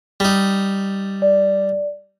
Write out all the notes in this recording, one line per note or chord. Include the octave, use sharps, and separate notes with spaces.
G3 D#4
D5